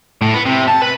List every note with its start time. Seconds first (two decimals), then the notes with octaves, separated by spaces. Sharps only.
0.22 A2
0.34 B3
0.46 C3
0.68 A5
0.82 B4